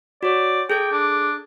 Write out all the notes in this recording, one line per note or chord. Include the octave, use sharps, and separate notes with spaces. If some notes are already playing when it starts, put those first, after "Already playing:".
F#4 C#5 D5
G#4 A4 G5 G#6
D4